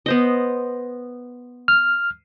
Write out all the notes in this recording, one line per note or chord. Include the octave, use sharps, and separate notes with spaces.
B3 C5 D#5
F6